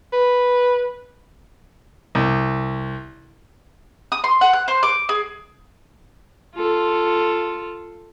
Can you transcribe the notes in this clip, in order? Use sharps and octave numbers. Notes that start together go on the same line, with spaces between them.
B4
C2
D#6
C6
F#5
F#6
C5
D6
G#4
F4 A4